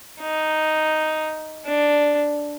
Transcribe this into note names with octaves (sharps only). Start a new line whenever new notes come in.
D#4
D4